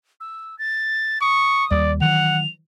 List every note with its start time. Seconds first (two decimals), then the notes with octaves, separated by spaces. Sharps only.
0.20 E6
0.59 A6
1.21 C#6 D#6
1.71 D#2 G3 D5
2.01 D#3 E3 F#3 F#5 F7